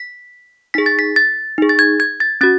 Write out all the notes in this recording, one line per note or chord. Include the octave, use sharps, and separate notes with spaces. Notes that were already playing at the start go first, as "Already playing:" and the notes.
Already playing: B6
D#4 G#4 B6
A6
B6
A6
D#4 G#4
A6
G#6
G#6
A6
C#4 F#4 A6